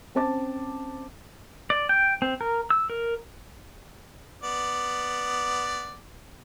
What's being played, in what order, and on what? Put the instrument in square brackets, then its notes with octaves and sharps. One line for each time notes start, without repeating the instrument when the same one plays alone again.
[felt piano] C4 C#4 C5 A5 D6 A6
[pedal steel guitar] D5
G5
C4
A#4
E6
A#4
[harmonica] B3 D5